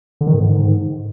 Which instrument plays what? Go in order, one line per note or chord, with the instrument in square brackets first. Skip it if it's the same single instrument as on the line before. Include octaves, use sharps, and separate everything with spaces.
[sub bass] D3
D#3
G#2